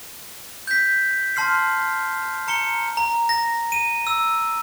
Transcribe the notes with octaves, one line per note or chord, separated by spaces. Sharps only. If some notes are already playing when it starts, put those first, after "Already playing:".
G6 B6
A5 C6 F6 C7
A#5 C#7 G7
A#5
A#6
D#7
E6